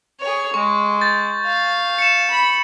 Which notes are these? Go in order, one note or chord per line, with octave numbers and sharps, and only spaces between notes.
G#4 C#5
G#3 C#6
G6 A6
F5
C#7 E7
B5